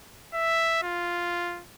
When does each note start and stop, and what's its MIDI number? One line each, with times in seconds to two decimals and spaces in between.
0.34 0.82 76
0.83 1.63 65